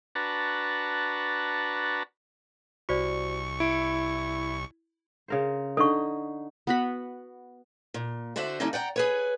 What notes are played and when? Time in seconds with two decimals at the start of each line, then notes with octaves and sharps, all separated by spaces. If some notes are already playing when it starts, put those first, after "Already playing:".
0.15 D4 F#4 B4 A5 A#5 C#6
2.89 C2 F#4 C5 D5 C#6
3.60 E4 C#7 D7
5.28 C#3 A#4 C5
5.77 D3 D#4 A4 C#6
6.67 B3 F#4 B5
7.94 A#2
8.36 D3 F#4 C5 D5 E5
8.60 D3 G3 A#3 C#4 D#4 E4
8.73 D5 F#5 G5 A#5
8.96 G#4 B4 C#5